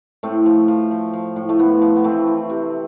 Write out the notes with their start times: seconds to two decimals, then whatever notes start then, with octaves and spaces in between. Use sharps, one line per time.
0.23 A2 A3 C4
0.46 F3
0.68 F3
0.91 F3
1.13 F3
1.36 A2
1.49 A3
1.59 A2 B3
1.81 F3
1.96 B3
2.04 E3 A3 C4
2.27 E3
2.50 C3